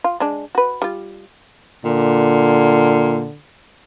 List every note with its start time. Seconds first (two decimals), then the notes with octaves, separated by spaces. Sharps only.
0.04 F4
0.20 G#3 D4
0.55 F#4 B4
0.82 G3 F4
1.85 A#2 D3